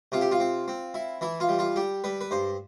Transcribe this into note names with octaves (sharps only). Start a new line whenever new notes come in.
C3 F4
G4
F4
C4
C4
E4
E3 E4
F4
G3
F4
G3 G4
G3 B4
B4
G2 C5